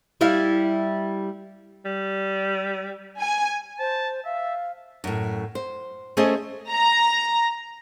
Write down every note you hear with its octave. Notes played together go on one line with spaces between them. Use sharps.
G3 E4 F5
G3
G#5
C5 A5
E5 F5
F#2 A2
C5
A3 C#4 G#4 C5 D#5
A#5